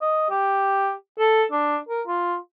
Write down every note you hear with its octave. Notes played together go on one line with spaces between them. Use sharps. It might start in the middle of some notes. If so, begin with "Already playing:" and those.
D#5
G4
A4
D4
A#4
F4